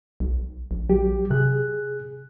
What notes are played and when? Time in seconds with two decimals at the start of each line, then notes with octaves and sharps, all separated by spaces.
0.20 B1
0.71 A#1
0.89 F#3 G4
1.30 C3 G#4 F#6